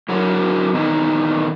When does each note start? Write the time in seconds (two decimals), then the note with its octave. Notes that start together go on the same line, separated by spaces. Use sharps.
0.09 D3 F#3 E4 F#4 A#4 C#5
0.74 A#2 D#3 E3 B3 D#4